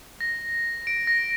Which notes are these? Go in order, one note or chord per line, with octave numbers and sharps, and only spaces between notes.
A#6
D7
A#6